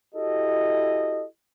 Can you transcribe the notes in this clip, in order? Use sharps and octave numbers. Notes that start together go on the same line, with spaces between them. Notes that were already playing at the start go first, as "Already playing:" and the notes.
E4 F#4 G4 A4 D#5